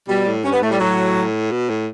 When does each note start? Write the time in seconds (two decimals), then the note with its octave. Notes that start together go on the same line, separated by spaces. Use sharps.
0.08 B2 G3
0.26 A2
0.44 G2 C#4
0.52 B3
0.62 A2 A3
0.71 G3
0.79 A2 F#3
1.51 B2
1.69 A2